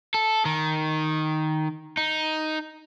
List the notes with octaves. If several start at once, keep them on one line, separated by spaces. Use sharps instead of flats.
A4
D#3
D#4